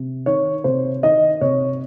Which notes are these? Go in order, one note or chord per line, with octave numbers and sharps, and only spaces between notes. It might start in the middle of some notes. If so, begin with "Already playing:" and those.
Already playing: C3
D#3 C#5
C3 C5
D#3 D#5
C3 C#5